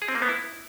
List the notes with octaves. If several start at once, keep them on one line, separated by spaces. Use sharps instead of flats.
G#4
C4
A#3
B3
E4